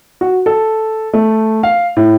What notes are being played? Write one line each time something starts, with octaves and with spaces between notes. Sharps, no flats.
F#4
A4
A3
F5
A2